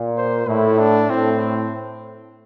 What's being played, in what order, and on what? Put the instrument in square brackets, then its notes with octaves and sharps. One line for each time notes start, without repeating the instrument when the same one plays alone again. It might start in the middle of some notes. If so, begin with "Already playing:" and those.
Already playing: [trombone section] A#2
[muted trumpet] C5
[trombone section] A2 [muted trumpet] E4
[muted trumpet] D4
[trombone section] A2 [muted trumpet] C4